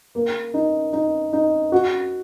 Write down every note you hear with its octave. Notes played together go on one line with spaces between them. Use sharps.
A#3
D#4
D#4
D#4
F#4